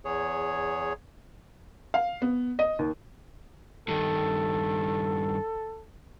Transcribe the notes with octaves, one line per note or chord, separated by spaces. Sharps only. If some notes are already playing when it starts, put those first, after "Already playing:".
E2 G#4 C#5
F5
B3
D#5
D#2
G2 D#3 A4